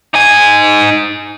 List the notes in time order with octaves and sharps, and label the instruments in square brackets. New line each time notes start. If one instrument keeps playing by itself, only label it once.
[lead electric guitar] D#4 G#5